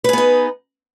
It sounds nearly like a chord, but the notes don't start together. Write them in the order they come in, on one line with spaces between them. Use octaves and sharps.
B4 G#4 B3 D#4